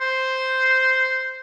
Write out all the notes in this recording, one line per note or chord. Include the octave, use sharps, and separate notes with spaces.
C5